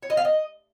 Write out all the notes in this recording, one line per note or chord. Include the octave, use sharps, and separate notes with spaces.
C#5
D#5
F5
D#5